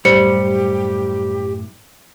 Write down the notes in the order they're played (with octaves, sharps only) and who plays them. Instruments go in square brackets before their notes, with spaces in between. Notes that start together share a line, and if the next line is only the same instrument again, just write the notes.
[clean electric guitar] F#2 A2 [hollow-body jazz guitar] G3 [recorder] G4 [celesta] C5 C#7